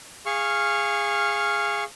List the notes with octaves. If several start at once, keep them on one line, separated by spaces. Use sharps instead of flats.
G#4 F5 C#6 F6